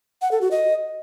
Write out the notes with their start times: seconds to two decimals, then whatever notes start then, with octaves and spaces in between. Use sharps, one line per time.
0.22 F#5
0.31 A4
0.41 F#4
0.51 D#5